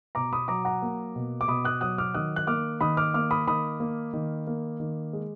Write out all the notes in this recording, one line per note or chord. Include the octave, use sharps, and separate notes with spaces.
B2 A#5 D6
B5 D#6
F#3 A#5 D6
F#5 A#5
A#3
B2
D6
B2 B5 D#6
D#6 F#6
F#3 D#6 F#6
D6 F6
D#3 D#6 F#6
F#6
A#3 D6 F6
D#3 B5 D#6
D6 F6
A#3 D6 F6
B5 D#6
D#3 B5 D#6
A#3
D#3
A#3
D#3
G#3